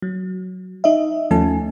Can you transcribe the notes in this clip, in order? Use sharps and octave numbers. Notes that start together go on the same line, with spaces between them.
F#3
D#4 D#5 E5
D#2 F3 A3 C#4 G#5 A5